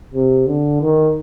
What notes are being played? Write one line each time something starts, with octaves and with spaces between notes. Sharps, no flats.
C3
D3
D#3